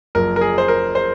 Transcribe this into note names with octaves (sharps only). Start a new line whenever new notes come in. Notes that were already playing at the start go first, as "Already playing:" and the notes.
F#1 F#2 F3 A#4
A#4
G#4
C5
A#4
C5